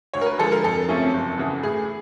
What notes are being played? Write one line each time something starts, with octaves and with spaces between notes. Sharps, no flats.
D2 C#5
A#4
B4
D3 F3 G#3 A4
A#4
F2 A4
C3 F3 A3 C#4
F#1
E2 C#3 E3
A2 G#4